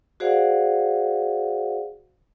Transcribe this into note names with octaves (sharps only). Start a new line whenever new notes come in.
F#4 G#4 C5 D5 F5 F#5